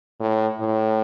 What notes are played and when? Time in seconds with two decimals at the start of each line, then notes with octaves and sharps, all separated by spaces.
0.20 A2
0.60 A2